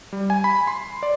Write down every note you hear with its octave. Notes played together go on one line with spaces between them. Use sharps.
G3
G#5
B5
C6
D5